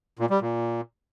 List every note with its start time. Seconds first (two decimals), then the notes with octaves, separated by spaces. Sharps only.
0.19 A#2
0.30 G3
0.41 A#2